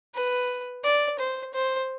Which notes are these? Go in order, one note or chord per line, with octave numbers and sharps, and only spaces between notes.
B4
D5
C5
C5